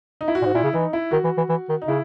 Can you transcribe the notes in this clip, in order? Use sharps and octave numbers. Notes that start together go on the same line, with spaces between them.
D#4
E4
F#4
A#2
G#2
A#2 E4
C#3
E3 D#4
E4
D#3 F#4
E3
E3
E3
D#3
D#4
C#3 E4